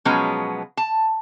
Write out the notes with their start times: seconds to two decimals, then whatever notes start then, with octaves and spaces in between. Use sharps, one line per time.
0.05 B2 F3 F#3 G#3 B3 C#4
0.77 A5